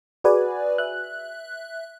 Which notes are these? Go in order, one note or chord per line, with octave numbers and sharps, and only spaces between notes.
F#4 G#4 B4 D5 G#5
E5 F#6